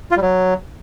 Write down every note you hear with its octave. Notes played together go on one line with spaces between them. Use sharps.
F4
G3
F#3